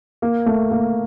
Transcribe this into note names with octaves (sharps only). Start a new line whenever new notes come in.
A#3
A3
A#3